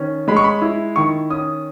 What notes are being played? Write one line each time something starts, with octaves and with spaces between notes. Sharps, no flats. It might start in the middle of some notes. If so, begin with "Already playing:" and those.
Already playing: D#3 C#4
G#3 B5
C#6
B5
E4
D#3 C#6
C#4 D#6